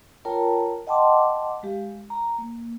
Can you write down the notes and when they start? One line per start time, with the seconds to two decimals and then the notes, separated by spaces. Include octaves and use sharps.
0.25 F4 A#4 C#5 G5 A5 A#5
0.87 D#5 F#5 G5 A5 C6 D6
1.63 G#3 G4 F5
2.10 A#5
2.38 A#3